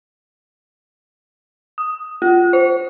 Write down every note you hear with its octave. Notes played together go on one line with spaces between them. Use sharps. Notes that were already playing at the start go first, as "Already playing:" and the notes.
D#6
F4
C5